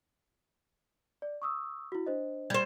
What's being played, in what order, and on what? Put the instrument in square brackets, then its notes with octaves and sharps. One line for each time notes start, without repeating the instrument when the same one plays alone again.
[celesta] D5
C#6 D#6 E6
E4 F#4
D4 C5 D#5
[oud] G3 C5 [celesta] G#6